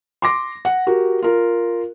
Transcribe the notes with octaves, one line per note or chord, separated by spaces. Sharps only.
C6 D6 A#6
F#5
F#4 G4 A#4
F4 A#4